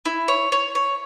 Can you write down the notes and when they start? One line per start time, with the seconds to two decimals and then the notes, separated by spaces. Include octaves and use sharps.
0.05 E4
0.28 C#5
0.52 C#5
0.75 C#5